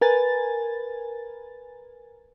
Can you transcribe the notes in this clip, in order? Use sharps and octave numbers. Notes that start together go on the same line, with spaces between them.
A#4 B4 G#5 A6